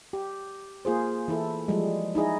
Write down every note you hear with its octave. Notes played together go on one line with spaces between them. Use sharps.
G4
A#3 F4 G#4 C5
E3 E4 A4
F3 G3 G#3
D#4 E4 G#4 D#5